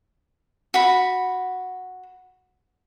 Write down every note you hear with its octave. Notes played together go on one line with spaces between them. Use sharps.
F#4 B5